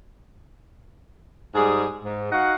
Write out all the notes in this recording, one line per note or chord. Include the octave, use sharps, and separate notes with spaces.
G#2 G3 G#4
G#2
D#4 F#4 F5 F#5